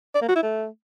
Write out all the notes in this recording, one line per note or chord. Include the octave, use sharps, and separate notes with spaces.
D5
A#3
F#4
E4
A3